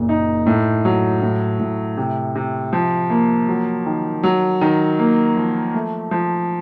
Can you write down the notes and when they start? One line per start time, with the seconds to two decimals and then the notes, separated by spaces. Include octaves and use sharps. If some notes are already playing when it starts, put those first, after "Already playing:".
Already playing: F#1 A#2
0.09 D#4
0.46 A2
0.85 F#3
1.22 A2
1.60 A2
1.97 C3
2.35 C3
2.73 F3
3.10 A#3
3.49 F#3
3.86 D#3
4.23 F#3
4.61 D#3
4.99 A#3
5.37 F3
5.74 A3
6.11 F3